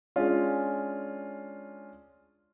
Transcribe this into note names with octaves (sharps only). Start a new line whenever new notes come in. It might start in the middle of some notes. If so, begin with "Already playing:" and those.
G#3 C#4 D4 F4